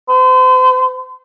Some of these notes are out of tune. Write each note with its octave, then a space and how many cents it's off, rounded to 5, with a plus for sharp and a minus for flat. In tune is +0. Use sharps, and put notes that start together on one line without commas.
C5 -40